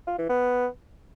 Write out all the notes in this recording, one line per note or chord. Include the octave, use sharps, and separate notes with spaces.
F4
E3
B3